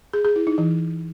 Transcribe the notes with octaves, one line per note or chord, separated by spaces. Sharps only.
G#4
G#4
E4
D#4
E3